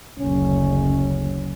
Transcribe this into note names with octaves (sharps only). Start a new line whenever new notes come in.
F#1 D2 C#4